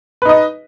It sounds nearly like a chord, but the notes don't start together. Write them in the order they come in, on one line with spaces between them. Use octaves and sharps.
B4 D#4 D#5